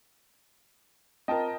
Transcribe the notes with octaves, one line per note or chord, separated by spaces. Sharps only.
C4 F4 A#4 D#5 G5 A5